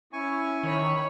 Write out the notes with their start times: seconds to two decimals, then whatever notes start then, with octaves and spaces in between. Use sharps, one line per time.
0.13 C#4 E4 G#5 C#6
0.63 D#3 C#5 B5